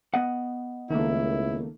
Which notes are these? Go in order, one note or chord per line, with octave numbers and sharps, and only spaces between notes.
B3 D#5 F#5
C#2 D#3 A3 A#3 E4